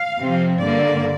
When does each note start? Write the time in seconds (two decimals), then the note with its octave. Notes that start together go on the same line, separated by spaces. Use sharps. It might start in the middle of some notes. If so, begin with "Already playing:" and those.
Already playing: F5
0.20 C3 F3 C4
0.60 G2 D3 A#3 D5